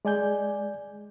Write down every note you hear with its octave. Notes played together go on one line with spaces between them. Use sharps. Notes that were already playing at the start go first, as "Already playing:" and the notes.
G#3 D5 G#5 G6